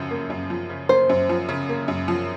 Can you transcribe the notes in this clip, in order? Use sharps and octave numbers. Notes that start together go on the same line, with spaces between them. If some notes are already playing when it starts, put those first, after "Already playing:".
Already playing: F#2 C#3 F3
A#3
F#2
F3
C#3
A#3 C5
F#2
F3
C#3
A#3
F#2
F3